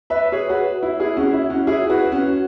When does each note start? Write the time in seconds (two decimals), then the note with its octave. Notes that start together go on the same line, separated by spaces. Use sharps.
0.10 B4 E5
0.32 G#4 C#5
0.49 F#4 B4
0.83 E4
1.00 E4 G#4
1.17 C#4 F#4
1.33 E4
1.50 C#4 F#4
1.67 E4 G#4
1.89 F#4 B4
2.12 C#4 F#4